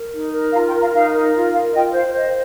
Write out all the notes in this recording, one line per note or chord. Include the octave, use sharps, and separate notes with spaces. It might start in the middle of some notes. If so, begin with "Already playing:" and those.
Already playing: A#4
D#4
A#4
F4 F5 A#5
G5 C6
A#4
F5 A#5
D#4 F5
A#4
F4
A#4 F5
F4 D#5 G5
C5 F5
C5 D#5